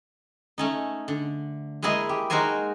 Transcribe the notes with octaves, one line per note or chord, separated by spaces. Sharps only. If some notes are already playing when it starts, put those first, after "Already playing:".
A3 C#4 D#4
D3
G#3 A#3 E4 G#4 D#5
G4
G#3 D#4 F#4 A#4 C5 G#5